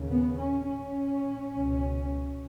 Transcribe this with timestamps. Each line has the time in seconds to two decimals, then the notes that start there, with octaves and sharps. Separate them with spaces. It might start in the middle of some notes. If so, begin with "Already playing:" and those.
Already playing: D#2 C#3
0.09 B3
0.38 C#4
0.67 C#4
1.54 C#2 B2